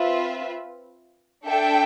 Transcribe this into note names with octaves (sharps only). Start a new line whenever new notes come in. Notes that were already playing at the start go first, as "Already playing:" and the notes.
Already playing: C4 F4 B4 E5
D4 A4 E5 G5